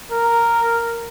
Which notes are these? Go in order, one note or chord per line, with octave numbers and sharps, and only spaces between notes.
A#4